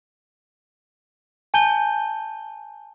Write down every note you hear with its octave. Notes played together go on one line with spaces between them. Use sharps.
G#5 A5 G6 D#7 G7